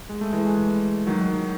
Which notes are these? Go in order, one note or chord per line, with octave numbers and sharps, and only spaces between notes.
G#3
A3
E3 G#3
D#3 F#3